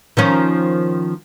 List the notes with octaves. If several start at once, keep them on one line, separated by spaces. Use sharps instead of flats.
D#3 F3 C#4